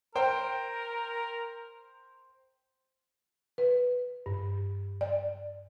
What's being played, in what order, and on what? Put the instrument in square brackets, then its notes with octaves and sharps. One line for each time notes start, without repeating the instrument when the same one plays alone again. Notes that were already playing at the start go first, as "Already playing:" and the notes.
[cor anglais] A#4 [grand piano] C5 G5
[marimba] B4
G2
D5